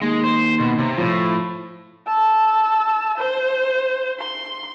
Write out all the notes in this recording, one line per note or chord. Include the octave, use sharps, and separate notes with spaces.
D#2 G#3
C5
B2
C3
A2 F3
A5 E6
C5
C6